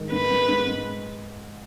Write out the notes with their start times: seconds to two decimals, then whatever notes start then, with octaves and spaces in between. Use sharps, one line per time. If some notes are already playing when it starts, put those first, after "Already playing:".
Already playing: G#2 D#3 G#3
0.11 G#2 B4
0.30 G#3
0.48 G#2
0.67 G#3